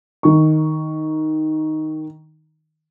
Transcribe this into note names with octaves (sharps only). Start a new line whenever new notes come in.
D#3 C#6